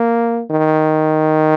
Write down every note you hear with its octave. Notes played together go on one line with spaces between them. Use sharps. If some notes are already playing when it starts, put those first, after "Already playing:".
Already playing: A#3
D#3